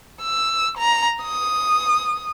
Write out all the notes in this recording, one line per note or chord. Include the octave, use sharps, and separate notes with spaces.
E6
A#5
D#6